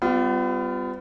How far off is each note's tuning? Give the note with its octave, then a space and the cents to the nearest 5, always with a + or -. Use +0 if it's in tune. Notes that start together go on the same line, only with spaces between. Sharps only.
G3 +0 B3 +40 F4 +0